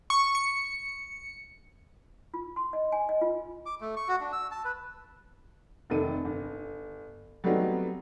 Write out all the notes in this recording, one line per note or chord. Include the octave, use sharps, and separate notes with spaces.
C#6
C#7
F4
C6
D#5
G#5
D#5
F4
D6
A3
C#6
F#4
D4
E6
A5
B4
F1 C3 D#3 A4 D#7
G1
F#3 G3 A3 B3 C4 D#4